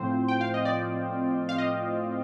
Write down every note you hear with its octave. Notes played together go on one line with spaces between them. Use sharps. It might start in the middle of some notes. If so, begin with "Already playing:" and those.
Already playing: A2 F3 C4 C5
G5
F5
D#5
D5
F5
D#5